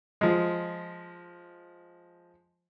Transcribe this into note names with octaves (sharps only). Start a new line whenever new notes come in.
F3 G#3